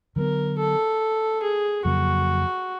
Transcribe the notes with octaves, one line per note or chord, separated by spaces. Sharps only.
D3 F#3 B3 A#4
A4
G#4
F2 C#3 F#3 A#3 F#4